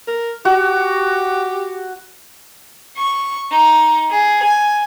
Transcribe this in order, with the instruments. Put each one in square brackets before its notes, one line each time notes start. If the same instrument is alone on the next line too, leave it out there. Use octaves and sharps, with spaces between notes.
[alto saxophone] A#4
[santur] F#4 [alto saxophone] G4
[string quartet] C#6
D#4
G#4
G#5